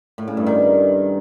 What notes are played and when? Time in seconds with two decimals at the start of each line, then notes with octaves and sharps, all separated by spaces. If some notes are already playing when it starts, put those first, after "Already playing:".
0.18 A2
0.27 C#3
0.37 G2
0.46 D#3